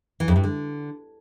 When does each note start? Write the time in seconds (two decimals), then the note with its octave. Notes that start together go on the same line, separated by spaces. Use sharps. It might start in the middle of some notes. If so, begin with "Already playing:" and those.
0.20 E3
0.28 F2
0.36 G2
0.44 D3